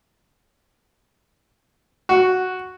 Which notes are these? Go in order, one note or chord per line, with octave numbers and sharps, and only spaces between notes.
F#4